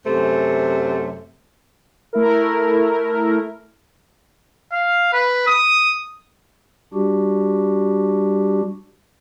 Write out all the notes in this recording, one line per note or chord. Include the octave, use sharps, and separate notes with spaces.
F#2 C3 A3 C5
A3 E4 A#4
F5
B4
D#6
G3 D4 F#4 G4